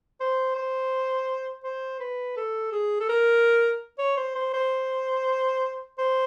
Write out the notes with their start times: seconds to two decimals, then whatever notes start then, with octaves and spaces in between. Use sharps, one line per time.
0.20 C5
0.56 C5
1.64 C5
2.00 B4
2.37 A4
2.72 G#4
3.00 A4
3.09 A#4
3.98 C#5
4.17 C5
4.35 C5
4.53 C5
5.98 C5